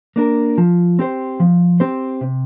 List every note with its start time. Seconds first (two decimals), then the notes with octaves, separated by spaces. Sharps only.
0.16 A#3 D4 A#4
0.58 F3
0.99 C4 G4 C5
1.40 F3
1.80 C4 G4 C5
2.21 C3